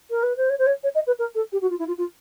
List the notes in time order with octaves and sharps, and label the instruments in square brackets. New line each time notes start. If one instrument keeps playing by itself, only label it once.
[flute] A#4
B4
C5
C#5
C5
C#5
C#5
D#5
B4
A#4
A4
G4
F#4
F4
E4
F4
F4